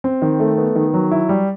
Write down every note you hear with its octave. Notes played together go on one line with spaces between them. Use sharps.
C4
D#3
A3
B3
D#3
F#3
E4
G3